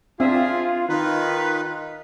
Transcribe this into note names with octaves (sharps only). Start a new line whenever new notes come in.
C4 D4 F4 G#4 E5
D#3 D#4 F4 B4